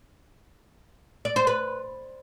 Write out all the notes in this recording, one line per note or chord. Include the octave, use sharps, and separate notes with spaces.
D5
C5
B4